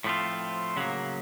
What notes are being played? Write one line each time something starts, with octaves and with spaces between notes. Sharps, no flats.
A2 F3 A3 C4 F4
C#3 F#3 A#3